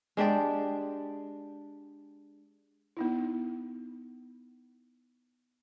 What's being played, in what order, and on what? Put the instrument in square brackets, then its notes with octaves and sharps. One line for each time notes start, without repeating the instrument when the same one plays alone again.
[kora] G#3 D4 G4 D5
[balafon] B3 D#4 E4